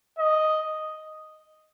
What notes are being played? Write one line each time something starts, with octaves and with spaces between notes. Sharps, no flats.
D#5